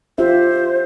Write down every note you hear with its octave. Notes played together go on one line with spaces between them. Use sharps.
F4 G4 C5 E5